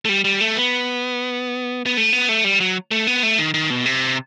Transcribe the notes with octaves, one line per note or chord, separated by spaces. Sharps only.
A3
G3
G3
A3
B3
B3
A3
B3
A3
G3
F#3
A3
B3
A3
D#3
D#3
B2
C3